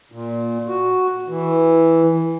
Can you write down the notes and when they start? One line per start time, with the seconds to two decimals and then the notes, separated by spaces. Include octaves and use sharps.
0.12 A#2
0.68 F#4
1.28 E3